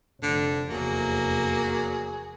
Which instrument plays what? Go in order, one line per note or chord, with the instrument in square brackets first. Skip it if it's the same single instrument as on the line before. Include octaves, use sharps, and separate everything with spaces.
[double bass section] F1 [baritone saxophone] D3
[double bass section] F1 E2 [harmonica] F#3 G#4 [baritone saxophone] A#3